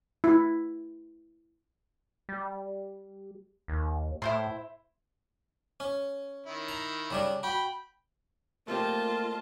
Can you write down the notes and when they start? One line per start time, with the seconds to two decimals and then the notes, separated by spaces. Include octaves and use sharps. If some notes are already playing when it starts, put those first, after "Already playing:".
0.24 E4
2.29 G3
3.68 D#2
4.22 A2 E4 C5 C6
5.80 C#4
6.46 D#3 E4
6.68 A#5
7.11 C#3 G3 D4
7.43 F#4 G5 B5
8.68 A3 A#3 C4 F4 G4 D#5 A5